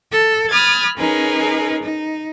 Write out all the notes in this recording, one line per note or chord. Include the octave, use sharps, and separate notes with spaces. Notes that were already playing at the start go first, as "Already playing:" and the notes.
A4
B5 D#6 F6 G#6 A6
C#4 D#4 G#4 A#4 B4
D#4